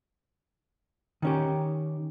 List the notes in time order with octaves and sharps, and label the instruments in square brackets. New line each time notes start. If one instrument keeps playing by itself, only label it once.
[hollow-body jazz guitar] D#3 C#4 G4